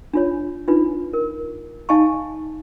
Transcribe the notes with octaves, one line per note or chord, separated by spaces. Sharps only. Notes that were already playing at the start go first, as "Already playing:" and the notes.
D4 F4 C#5
D4 D#4 F4 B4
A#4
D#4 D#5 F5 G#5 A5 C#6